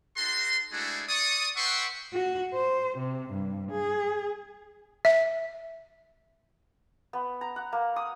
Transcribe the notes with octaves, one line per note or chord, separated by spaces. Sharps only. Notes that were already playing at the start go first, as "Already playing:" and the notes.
D#4 F#4 A4 C6
G#3 A3 D4 E4 F#4 G#4
D5 C#6 D#6
B4 E5 F#5 G5 C6 C#6
F#4
C5
C3
G2
G#4
E5
B3
A#5
F#5
A#3
D#6